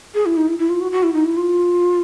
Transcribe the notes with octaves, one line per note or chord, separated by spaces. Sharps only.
G#4
E4
D#4
E4
E4
F4
F#4
F#4
E4
D#4
E4
F4